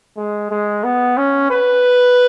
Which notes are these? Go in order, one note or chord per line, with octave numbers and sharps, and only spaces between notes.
G#3
G#3
B3
C#4
B4